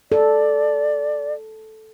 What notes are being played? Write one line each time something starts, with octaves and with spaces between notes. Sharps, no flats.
A4 D5